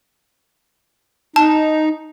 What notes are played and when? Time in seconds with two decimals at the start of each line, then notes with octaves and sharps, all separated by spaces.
1.36 D#4 A5